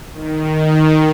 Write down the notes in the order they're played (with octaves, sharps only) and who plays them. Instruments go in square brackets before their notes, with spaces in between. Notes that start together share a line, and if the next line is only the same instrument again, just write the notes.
[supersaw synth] D#3